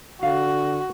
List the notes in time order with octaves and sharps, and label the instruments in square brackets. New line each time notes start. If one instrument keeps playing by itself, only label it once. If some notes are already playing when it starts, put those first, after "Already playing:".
[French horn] D3 [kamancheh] F#4 [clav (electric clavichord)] F5